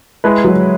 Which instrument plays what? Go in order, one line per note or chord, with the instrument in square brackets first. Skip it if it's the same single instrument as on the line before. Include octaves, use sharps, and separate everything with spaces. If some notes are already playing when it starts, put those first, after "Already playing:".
[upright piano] G#3 E4 B4
[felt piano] F#3